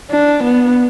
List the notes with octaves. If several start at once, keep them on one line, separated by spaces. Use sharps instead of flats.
D4
B3